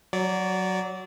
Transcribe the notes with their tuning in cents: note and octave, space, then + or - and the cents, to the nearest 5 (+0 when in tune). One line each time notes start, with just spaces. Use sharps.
F#3 +5 D5 -20